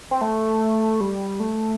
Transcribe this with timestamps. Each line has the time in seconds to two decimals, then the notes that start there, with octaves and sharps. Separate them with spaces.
0.11 C4
0.21 A3
1.01 G3
1.40 A3